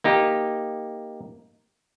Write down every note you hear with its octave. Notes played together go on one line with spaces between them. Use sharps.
A#3 D#4 G4